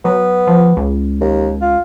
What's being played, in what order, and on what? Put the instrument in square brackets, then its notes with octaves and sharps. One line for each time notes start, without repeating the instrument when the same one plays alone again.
[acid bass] F#3 [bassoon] B3
[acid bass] F3
C#2
[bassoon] D#2
F4